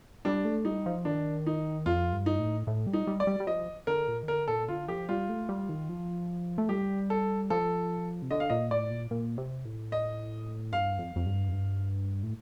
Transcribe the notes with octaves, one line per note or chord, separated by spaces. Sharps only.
G3 D4
A3
G3 D#4
F3
D#3 D4
D#4
F2 F4
G2
D#4
A2
A2
G3
D#4
G3
D5
G3
G3
F3 D#5
D3 A#4
A#2
D#3
D3 A#4
A#2 A4
D3 F4
F3 G4
G3 F4
A3
G3
D#3
F3
A3
G3 G4
A4
F3 A4
C3
D3 D#5
F5
A#2 D#5
A2 D5
A#2
A#2
C3
A2
D#5
G2 F5
F2
F2
G2
F2
G2
A2